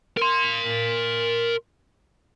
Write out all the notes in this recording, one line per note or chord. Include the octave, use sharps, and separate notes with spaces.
A#4 C6